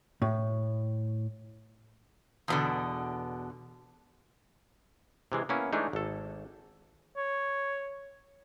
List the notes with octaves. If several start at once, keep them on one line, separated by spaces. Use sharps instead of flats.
A2
E2 B2 D3
C3 E3 G#3
A#3 B3 C#4 E4
E3 G#3 A3 D4 D#4
G#1 A4
C#5